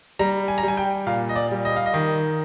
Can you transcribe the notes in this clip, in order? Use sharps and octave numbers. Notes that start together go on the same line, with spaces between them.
G3 A#5
G#5
A#5
G3 G#5
G5
A#2 F5
D#5
D5
G3
D#5
F5
D#5
D#3